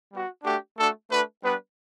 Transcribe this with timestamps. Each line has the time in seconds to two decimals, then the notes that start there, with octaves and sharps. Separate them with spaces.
0.11 G3 B3 F#4
0.43 A3 D4 F#4 G4
0.76 A3 D4 F#4 A4
1.09 A3 D4 F#4 B4
1.42 G3 B3 D4 B4